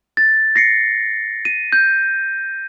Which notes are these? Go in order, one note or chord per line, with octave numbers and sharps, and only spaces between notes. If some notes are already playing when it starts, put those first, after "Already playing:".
A6
A#6 C7 C#7
D#7
G6